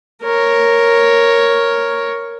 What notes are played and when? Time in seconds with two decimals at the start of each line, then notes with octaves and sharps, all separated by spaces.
0.22 A#4 C#5